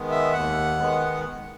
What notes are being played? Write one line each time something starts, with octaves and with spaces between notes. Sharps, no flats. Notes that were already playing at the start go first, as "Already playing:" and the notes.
Already playing: D#3 G#3 B3
E5
D#2 F#5
D#3 G#3 B3